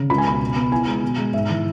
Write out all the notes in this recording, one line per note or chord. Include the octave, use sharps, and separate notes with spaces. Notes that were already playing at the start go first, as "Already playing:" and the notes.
Already playing: C#3
C#2 B5
G#5
B2 B5
B2
B3
E4 G#5
G#3
B2
G#3
G#2 E5
E3